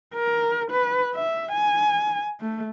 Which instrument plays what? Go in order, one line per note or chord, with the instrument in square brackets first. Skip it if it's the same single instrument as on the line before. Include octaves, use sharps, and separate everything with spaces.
[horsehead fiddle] A#4
B4
E5
G#5
A3